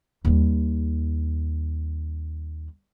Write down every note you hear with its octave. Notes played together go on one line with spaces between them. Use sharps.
D#2 G3